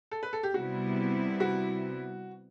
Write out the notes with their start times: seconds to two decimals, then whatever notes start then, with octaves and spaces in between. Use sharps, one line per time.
0.11 A4
0.23 B4
0.33 A4
0.43 G4
0.54 C3 G3 B3 E4 F#4
1.40 F#4